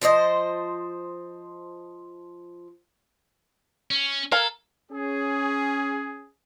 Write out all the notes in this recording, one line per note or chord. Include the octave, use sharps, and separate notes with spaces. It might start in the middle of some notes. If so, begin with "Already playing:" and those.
F3 C5 C#5 D#5
C#4
A4 A#4 F5 G#5
C#4 G#4